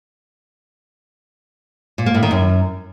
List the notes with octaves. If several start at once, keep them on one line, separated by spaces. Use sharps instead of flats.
A#2
A#3
A2
D#3
F#2